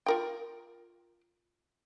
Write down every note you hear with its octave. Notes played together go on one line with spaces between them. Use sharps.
F4 A#4 G5